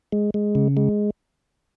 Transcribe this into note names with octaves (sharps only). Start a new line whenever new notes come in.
G#3
G#3
C#3
G#3